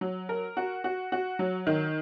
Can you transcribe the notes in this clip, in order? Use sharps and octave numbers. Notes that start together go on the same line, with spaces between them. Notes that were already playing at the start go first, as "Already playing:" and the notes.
F#3
A#4
F#4
F#4
F#4
F#3
D#3